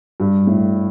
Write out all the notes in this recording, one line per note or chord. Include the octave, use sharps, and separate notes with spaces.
G2
A2